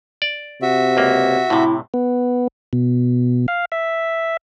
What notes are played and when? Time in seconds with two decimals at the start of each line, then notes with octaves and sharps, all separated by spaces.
0.22 D5
0.62 C3 F#4 E5
0.97 C#2 A#3
1.50 A2 C3 E4
1.94 B3
2.73 B2
3.48 F5
3.72 E5